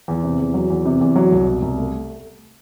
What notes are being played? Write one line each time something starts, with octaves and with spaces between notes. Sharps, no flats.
E2
C3
E2
F#3
E2
C3
E2
F#3
C2
B2
C2
A3